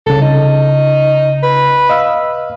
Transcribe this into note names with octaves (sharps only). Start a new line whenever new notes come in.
C2 C#3 A4
D#4
B4
D#5 F5 E6